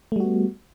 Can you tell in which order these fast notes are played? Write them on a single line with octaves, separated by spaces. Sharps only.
A3 G3 F#4 B3